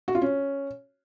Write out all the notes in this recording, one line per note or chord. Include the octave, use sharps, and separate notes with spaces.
F#4
F4
C#4